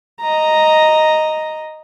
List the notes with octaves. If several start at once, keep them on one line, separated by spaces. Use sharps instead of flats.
D#5 A#5